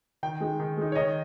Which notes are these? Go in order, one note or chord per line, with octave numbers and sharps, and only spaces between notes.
D#3 G5
G#3 D#4
D#3
G#3 D#4
C#5
D#3 D#5